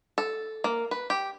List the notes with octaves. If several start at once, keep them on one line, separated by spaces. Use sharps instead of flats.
A4
A#3
B4
G4